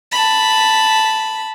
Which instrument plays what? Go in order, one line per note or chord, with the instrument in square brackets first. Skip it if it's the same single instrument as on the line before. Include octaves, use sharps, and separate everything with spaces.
[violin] A5 B5